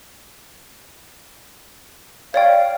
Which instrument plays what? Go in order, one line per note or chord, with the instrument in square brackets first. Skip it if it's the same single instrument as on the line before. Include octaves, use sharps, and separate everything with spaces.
[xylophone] C#5 D5 G5 [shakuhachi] F5